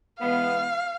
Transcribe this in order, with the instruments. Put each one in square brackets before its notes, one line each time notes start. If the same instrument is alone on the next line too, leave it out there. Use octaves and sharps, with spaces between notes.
[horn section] E3 G#3 B3 [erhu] F5